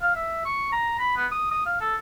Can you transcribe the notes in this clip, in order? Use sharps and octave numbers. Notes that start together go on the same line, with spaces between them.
F5
E5
C#6
A#5
B5
B3
D#6
D#6
F5
A4